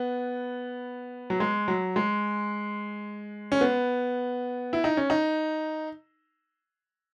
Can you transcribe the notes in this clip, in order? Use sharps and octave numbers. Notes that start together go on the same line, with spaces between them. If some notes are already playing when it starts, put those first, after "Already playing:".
Already playing: B3
F#3
G#3
F#3
G#3
C#4
B3
E4
D#4
C#4
D#4